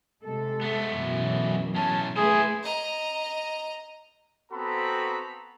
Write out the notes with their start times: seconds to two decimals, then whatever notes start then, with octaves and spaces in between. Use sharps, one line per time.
0.23 C3 G#3 A4
0.61 A3 B3
0.93 F#2 B2 E3
1.76 A2 C#4 A5
2.17 A3 E4 G#4 B4 C5
2.63 D#5 A#5
4.52 B3 C4 F#4 A4 A#5 B5